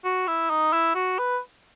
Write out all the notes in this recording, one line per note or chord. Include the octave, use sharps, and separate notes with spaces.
F#4
E4
D#4
E4
F#4
B4